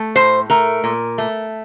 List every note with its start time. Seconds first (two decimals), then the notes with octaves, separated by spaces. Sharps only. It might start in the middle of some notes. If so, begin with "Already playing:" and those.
Already playing: A3
0.15 A2 C5
0.50 A3 A#4
0.84 A#2
1.18 A3